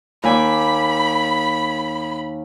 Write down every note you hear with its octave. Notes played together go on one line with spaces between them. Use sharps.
D#2 G#5 B5 D6